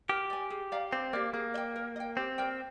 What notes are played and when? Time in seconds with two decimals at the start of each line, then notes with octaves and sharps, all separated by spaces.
0.09 G4 A#4
0.30 D5 G#5
0.50 G#4
0.72 D5 F5 A#5
0.92 C4 D4
1.13 A#3 G4 D5
1.34 A#3 G#4
1.54 D5
1.58 G5
1.76 A#4
1.96 D#5
2.00 G5
2.17 C4 G4
2.38 A#4 D5 G5